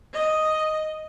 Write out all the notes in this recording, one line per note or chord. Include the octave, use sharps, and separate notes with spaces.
D#5